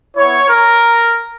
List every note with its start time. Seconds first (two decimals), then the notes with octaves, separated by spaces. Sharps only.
0.16 B3 E4 C#5
0.49 A#4